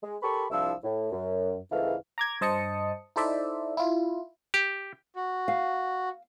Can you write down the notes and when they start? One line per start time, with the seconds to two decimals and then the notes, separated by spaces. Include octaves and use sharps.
0.03 G#3
0.23 G4 A4 A#4 B5 C#6
0.51 C2 F3 D4 E4 E6
0.83 A2
1.12 F#2
1.71 C#2 G#2 E3 A3 E4 F5
2.18 A#5 D6 G#6
2.41 G2 C5 D#5 A5 D#6 C#7
3.16 D#4 E4 A4 C5 D5 E5
3.77 E4 F4
4.54 G4
5.16 F#4
5.48 F5